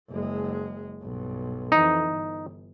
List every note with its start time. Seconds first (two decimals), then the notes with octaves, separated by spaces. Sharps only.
0.11 F#1 G#3
1.02 B1 G2
1.72 F2 E3 D#4
2.05 G1